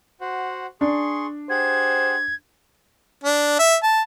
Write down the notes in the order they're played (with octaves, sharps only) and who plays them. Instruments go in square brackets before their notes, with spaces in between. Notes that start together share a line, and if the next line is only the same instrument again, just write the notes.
[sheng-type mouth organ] F#4 C5 F#5
[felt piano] D4 [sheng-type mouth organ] G#4 C6 C#6
[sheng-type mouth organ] G4 G#4 F#5 [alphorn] C5 [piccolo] G#6
[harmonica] D4
E5
A5